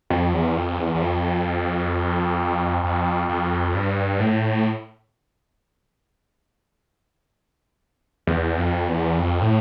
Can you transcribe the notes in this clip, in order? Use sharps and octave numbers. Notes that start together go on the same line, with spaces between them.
F2
E2
F2
E2
E2
F2
F2
F2
G2
A2
E2
F2
E2
F2
A2